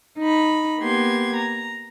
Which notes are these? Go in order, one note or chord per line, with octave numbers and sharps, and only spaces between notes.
D#4 B5
A#3 B3 G4 C6 G#6
A#5